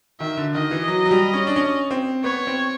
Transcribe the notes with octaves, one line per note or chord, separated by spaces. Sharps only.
D#3 E5
D3
D#3 D#5
E3
F#3
F#3
G3
C#4
D4
C#4
C4
B3 C#5
C4